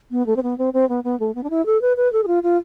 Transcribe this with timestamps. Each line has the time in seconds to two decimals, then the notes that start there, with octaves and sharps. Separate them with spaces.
0.11 B3
0.27 A3
0.36 C4
0.43 B3
0.58 C4
0.73 C4
0.89 B3
1.04 B3
1.20 A3
1.35 B3
1.43 D4
1.50 E4
1.66 A4
1.82 B4
1.97 B4
2.13 A4
2.23 G#4
2.27 F4
2.43 F4